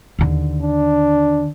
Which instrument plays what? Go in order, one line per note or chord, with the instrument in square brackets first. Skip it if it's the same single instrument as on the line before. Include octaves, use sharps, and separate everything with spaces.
[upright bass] D#2 D3
[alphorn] D4